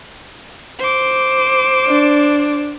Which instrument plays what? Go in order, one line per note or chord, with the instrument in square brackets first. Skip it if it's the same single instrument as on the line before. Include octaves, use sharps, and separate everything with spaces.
[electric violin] C5 D6
[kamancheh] D4